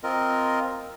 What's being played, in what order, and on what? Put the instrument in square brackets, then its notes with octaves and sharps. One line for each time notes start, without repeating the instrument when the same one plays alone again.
[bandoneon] C4 F4 A#4 D#5